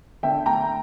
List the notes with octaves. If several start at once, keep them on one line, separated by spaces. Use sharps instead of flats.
D3 E5 G5
A3 G5 A#5